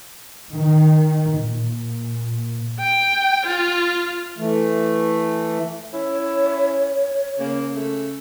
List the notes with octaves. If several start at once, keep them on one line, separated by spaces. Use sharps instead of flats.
D#3
A#2
G5
F4
E3 A3
C#4 E4 C#5
C#3 A#3
C#3 A3 A4